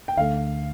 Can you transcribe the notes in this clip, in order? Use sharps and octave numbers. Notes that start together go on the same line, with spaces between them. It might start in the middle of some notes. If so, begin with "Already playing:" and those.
G5
D2 D3 A3 F5